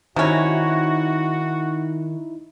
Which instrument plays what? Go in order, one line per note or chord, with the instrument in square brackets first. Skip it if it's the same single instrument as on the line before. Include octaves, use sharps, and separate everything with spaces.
[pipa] C3 C#4 [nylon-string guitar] D#3 [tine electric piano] D#4 E4 [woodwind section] F#4